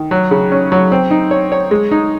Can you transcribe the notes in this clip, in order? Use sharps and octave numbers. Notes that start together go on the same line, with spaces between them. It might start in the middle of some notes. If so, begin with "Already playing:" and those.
Already playing: D#3
F#3
C#3
C#4
F#3
C4
D#4
C#5
C#5
G#3
D#4